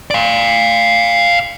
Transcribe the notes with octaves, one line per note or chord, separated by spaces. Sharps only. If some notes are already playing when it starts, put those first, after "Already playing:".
D5 F5